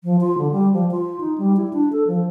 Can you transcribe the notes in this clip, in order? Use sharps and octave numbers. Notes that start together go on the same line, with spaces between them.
F3
F4
D3
G3
F3
F4
D#4
G3
E4
D4
A4
F3